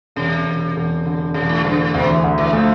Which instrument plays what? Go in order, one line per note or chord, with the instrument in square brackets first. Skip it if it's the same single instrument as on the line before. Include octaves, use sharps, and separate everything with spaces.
[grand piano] E1 [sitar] C3
[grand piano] E1
E1
D3
[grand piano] E1 [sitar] C3
[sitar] A2
[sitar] G2 [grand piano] D3
[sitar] A2
[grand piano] D2 [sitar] B2
[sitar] E3
[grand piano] D2
[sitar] E3
[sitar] F3 [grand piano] A3